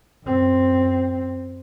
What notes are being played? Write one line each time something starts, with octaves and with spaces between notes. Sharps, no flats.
F#2 C4